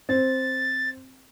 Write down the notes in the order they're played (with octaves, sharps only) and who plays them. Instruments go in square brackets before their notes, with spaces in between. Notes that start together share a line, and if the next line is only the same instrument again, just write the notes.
[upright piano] C4 [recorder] A6